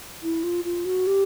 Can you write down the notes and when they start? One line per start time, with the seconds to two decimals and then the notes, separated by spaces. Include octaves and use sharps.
0.23 E4
0.43 F4
0.64 F4
0.85 F#4
1.07 G4